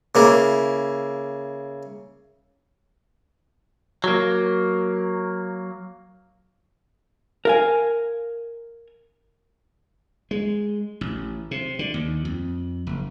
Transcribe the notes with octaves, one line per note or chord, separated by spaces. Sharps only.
C#3 A#3 E4
F#3 A#3
A#4 F5 G#5
G#3
A1
C3
D3
D#2
F2
F#1